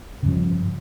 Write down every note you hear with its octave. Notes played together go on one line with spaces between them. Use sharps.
G2 C#3 F3